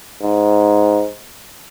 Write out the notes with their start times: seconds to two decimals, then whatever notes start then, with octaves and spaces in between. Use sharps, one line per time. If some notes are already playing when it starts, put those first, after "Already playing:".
0.22 G#2